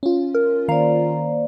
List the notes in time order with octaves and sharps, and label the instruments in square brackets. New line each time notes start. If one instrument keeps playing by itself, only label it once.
[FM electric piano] C#4 F4
[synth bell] A#4
[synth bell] D#3 F5 A#5 [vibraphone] A#3 C5 D5